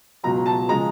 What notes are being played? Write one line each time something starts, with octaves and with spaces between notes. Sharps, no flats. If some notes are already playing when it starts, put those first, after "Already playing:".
C#2 B2 F#3 A#5
A5
C#3 F3 G#3 A#5